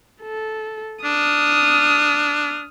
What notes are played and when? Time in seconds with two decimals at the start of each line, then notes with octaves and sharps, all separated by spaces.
0.22 A4
1.05 D4 D#6 F6